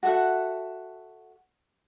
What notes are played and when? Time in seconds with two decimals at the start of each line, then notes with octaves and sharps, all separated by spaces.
0.03 F#4 A4 E5 F#5